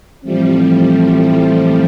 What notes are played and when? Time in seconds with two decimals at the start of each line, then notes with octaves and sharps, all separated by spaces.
0.24 A2 E3 F3 G3 A3 C4
1.16 F3 G3